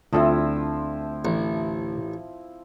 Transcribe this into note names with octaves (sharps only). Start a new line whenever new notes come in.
D2 F3 C4 D4 E4 A4
A1